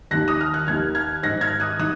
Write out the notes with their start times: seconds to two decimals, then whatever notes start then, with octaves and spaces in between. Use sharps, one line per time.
0.11 D#2 D#3 F#6 A#6
0.28 D#6
0.41 F6
0.54 F#6
0.67 D#2 D#3 F6 G#6
0.95 F6 G#6
1.23 G#2 D#3 F#6 A#6
1.41 F6 G#6
1.60 D#6 F#6
1.79 D#3 D#6 F#6